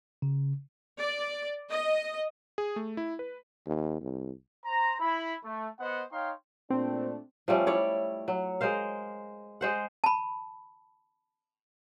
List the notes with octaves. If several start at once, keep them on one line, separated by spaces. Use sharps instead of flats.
C#3
D5
D#5
G#4
A3
E4
B4
D#2
C2
C5 A#5
E4 B5
A3
B3 C5 D#5 F#5
D#4 C#5 F5 G5 C6
A#2 A3 C4 D4
F3 G3 A3 C#4
E4 C#5 D5
F#3
G#3 A#4 C5 F5
G#3 C5 F#5
A5 B5